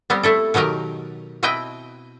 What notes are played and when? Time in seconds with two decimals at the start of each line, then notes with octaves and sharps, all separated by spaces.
0.10 G3 B3 C4 G4
0.23 A3 E4 A4
0.54 B2 D#3 F#3 G4 A#4
1.43 B2 C4 E4 B4 D#5 G5